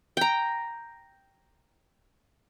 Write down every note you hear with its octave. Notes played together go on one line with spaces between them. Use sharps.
G5 A#5